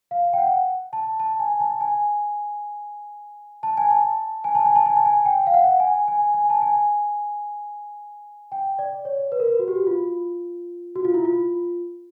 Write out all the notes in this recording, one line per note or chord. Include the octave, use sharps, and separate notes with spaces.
F5
G5
F#5
A5
A5
G#5
A5
G#5
A5
G#5
A5
G#5
A5
G#5
A5
G#5
A5
G#5
G5
F5
F#5
G#5
G#5
G#5
A5
G#5
G5
D5
C#5
B4
A#4
B4
F#4
G4
F#4
F4
F#4
F4
E4
F4